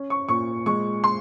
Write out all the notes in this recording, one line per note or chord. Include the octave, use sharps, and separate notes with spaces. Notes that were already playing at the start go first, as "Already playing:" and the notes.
Already playing: C#4
C#6
A#2 C#6
G#3 C#6
C6